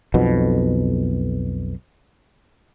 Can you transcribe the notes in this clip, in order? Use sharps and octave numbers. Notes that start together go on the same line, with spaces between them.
B1 F2 B2